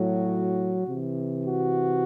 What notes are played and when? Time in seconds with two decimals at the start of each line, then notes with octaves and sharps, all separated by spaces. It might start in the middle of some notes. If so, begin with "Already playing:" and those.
Already playing: A2 F#3 F#4
0.88 C3 E3
1.43 F#4